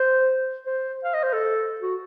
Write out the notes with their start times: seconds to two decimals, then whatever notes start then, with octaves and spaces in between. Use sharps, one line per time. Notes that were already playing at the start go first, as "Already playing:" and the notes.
Already playing: C5
0.66 C5
1.04 F5
1.14 D#5
1.24 C5
1.33 A4
1.81 F#4